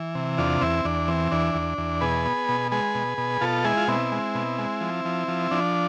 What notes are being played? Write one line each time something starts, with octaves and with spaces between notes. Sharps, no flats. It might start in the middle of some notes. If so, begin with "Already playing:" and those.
Already playing: E3
C3
E2 D4 F4
E2 C4 E4
E2 D4
E3 C4
E2 D4
E2
E2
B2 G#4 B4
B3
B2
G#3 G#4 B4
B2
B2
B2 F4 A4
G#3 E4 G#4
F4
B2 C4 E4
G#3
B2
G#3
F3
F3
F3
F3 D4